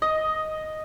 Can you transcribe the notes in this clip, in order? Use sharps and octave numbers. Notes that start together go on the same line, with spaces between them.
D#5